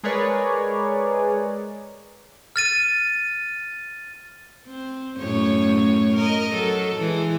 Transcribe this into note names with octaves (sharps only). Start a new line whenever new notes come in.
G#3 G#4 A#4 B4 C#5 D5
F6 A6 D#7
C4
F#2 A2 C#5
A#4 D#5
F#3 A4
E3 G#3